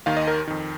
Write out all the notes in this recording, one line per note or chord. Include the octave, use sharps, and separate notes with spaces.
D#2 D#3 F5
D#5
A#4
F2 D#3